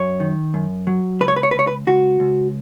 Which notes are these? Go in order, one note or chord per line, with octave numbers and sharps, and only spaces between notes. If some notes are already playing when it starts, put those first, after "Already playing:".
Already playing: F#2 C#5
D#3
F#2
F#3
C#2 B4
C#5
B4
C#5
B4
C#2 C#5
B4
C#2 F#4
C#2